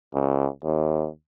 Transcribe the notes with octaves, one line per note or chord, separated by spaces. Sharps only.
C#2
D#2